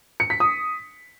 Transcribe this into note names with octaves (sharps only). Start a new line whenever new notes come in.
C#7
B6
D#6